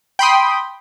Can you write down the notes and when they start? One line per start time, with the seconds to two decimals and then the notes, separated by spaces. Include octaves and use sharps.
0.19 G5 B5 C6 D#6